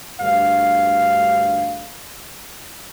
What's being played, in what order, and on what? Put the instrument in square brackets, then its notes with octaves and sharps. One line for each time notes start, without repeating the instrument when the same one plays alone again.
[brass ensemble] D2 G2 F5